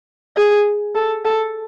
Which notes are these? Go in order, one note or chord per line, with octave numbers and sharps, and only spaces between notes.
G#4
A4
A4